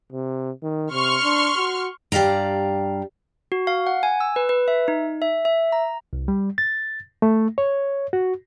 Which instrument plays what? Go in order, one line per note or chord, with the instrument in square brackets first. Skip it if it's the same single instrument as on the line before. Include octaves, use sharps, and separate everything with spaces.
[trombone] C3
D#3
[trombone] C3 [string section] C6 C#6 F6
[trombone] D4
F#4
[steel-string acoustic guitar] G2 G4 D5 F5 A#5
[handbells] F#4
F5
F#5
G#5
E6
B4
B4
E5
D#4
E5
E5
A#5
[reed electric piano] C2
G3
A6
A3
C#5
F#4